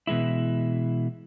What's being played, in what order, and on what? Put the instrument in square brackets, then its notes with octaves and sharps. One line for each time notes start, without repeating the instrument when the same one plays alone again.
[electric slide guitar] B2 E3 G#3 E4